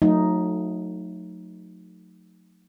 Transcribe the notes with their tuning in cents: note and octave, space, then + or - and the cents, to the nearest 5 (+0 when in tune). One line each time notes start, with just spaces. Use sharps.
F#3 -35 A3 +0 D#4 +0